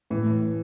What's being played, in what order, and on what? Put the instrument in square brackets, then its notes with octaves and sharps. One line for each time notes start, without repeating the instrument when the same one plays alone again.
[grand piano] A2 [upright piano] E3